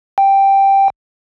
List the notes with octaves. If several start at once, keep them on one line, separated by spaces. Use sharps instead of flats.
G5